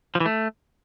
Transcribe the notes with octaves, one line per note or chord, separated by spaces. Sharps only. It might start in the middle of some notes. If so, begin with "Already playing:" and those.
F3
E3
A3